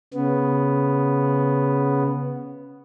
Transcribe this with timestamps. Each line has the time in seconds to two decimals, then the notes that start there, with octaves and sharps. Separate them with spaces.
0.14 C#3 B3